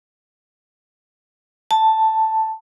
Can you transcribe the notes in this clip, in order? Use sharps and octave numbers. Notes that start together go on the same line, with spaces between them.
A5